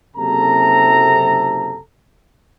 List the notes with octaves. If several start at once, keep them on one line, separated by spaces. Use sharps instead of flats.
F#1 C3 A4 A#5